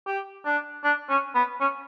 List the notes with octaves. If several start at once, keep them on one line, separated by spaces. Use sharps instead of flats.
G4
D4
D4
C#4
B3
C#4